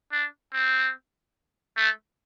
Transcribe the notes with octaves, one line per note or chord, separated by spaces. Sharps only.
D4
C4
A3